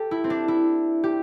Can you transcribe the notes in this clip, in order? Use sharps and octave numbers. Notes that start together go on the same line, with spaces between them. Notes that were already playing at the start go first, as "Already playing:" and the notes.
Already playing: G4 A4
E4
C4
D4
E4
G4